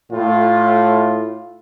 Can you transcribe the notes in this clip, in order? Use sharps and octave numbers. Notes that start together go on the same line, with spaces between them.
A2 F4